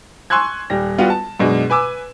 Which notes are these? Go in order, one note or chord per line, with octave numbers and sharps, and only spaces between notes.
G#5 C6 C#6 E6 F#6 G#6
D#1 G3 A#6
G3 B3 F4 F#4
A5
F#2 B2 G#3 D4
B4 G#5 D6 E6